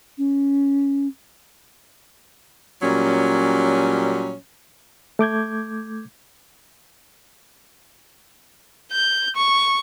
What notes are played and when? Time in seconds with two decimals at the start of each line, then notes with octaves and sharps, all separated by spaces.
0.18 C#4
2.83 A#2 F#3 G3 C#4
5.19 A3 D6 G6 G#6
8.92 G6
9.36 C#6